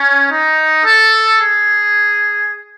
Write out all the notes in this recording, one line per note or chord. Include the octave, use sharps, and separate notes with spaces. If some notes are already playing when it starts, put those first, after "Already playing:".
Already playing: C#4
D#4
A4
G#4